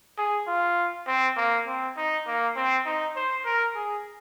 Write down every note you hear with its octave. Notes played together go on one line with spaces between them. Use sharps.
G#4
F4
C4
A#3
C4
D#4
A#3
C4
D#4
C5
A#4
G#4